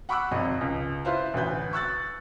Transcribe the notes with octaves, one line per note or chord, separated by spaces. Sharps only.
F#5 B5 C#6 D6 E6 F#6
G#1 F2 D#5
C#2
E4 F4 B4 C5 F5
A1 D2 B4 G6
C#6 E6 F#6 A6